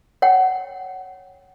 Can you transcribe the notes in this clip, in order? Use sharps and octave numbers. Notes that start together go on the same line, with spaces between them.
C#5 F#5 G5